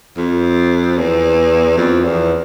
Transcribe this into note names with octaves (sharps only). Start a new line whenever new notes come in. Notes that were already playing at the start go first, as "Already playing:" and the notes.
F2
E2
F2
E2